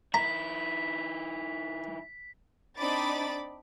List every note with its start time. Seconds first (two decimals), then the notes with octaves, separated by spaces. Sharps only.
0.14 D#3 E4 A#5 B6
2.77 C4 D4 D#4 B5 D6 A6